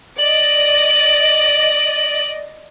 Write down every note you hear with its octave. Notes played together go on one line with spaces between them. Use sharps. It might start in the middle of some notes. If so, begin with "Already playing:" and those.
D5 D#5 F#7